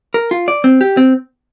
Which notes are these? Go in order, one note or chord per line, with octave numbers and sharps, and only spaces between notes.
A#4
F4
D5
C4
G4
C4